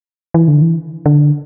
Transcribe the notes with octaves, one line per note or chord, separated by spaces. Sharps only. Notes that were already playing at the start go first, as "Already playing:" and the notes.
E3
D3
E3
D3